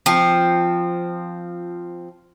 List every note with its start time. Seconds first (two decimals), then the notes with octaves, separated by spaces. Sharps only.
0.06 F3 C4